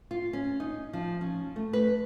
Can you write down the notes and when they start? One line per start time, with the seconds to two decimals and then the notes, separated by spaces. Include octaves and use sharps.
0.11 F4
0.33 C#4
0.60 D#4
0.93 F3
1.21 C#4
1.56 A3
1.73 B4